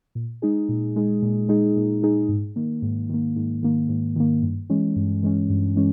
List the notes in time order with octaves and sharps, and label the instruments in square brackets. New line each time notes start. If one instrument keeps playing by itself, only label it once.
[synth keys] A#2
G#3 D#4 G#4
A#2
G#3 D#4 G#4
A#2
G#3 D#4 G#4
A#2
G#3 D#4 G#4
G#2
D#3 A#3
G#2
D#3 A#3
G#2
D#3 A#3
G#2
D#3 A#3
G2
E3 G#3 C#4
G2
E3 G#3 C#4
G2
E3 G#3 C#4